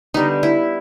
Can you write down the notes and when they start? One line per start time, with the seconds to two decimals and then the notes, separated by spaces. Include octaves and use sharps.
0.14 D3 G3 B3 D#4
0.43 E4